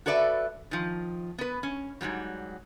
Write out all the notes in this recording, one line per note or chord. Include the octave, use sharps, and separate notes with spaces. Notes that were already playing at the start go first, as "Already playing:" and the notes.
F#4 A4 B4 D5 E5
D#3 F3
B3 B4
C#4
G#2 C3 F#3 G3